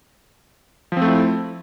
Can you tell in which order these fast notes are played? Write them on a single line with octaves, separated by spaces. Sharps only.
F3 C4 A3 E4